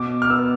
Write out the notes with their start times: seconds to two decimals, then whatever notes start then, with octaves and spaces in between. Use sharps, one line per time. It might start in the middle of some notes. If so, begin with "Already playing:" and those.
Already playing: B2 D6
0.22 F6
0.30 B3 E6